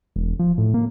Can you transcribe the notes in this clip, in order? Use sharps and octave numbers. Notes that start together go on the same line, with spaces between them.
E1
F3
A2
A#3